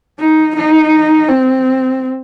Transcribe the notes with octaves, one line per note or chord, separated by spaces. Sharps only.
D#4
D#4
C4